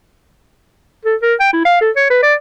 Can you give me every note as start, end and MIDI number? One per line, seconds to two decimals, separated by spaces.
1.05 1.16 69
1.22 1.34 70
1.40 1.49 79
1.53 1.64 64
1.65 1.77 77
1.81 1.91 69
1.96 2.06 73
2.10 2.18 71
2.22 2.34 74